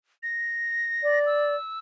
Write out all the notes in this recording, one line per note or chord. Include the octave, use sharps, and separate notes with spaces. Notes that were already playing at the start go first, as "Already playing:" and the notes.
A#6
D5
E6